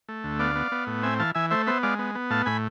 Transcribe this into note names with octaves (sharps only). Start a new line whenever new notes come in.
A3
D2
B3 D5 F5
B3
B3
A2
C4 E5 G#5
E3 F5 A5
E3 E5 G#5
A3 C5 E5
B3 C5 E5
G#3 D5 F5
B3
B3
A2 F5 A5
A2 G#5 B5